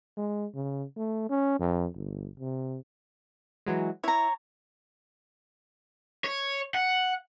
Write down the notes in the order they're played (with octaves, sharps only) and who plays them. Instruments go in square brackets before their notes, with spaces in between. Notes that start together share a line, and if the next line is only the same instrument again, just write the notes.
[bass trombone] G#3
C#3
A3
C#4
F2
G1
C3
[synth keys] E3 F#3 G#3
[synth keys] E4 [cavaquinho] C#5 A#5
[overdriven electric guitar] C#5
F#5